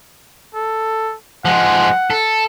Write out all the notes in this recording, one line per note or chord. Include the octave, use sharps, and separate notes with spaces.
A4
F3 G#3 F#5
A4